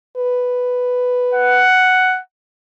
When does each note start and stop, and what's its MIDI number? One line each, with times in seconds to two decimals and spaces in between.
0.16 1.64 71
1.35 2.20 78